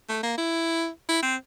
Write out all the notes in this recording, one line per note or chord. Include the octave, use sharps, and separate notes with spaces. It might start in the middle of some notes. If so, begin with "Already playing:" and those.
A3
A#3
E4
E4
C4